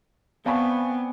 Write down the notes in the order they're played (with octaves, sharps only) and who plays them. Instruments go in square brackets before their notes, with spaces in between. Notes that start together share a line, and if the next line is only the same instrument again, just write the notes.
[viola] B3 [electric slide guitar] C4 [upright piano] D5 G#5 B5 [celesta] F5 A5 C#6